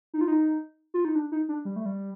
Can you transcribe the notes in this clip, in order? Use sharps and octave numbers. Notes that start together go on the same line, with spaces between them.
D#4
F4
D#4
F4
D#4
D4
D#4
D4
G3
A3
G3